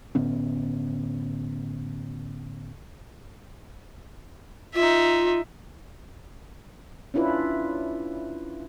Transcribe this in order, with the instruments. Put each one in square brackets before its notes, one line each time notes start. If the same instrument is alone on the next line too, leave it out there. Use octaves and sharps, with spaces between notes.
[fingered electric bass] A2 D3 B3 C#4
[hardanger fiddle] D#4 E5 [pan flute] F4
[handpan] C#4 D4 E4 F4 B4